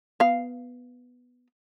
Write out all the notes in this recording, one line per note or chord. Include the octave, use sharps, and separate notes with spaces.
B3 F5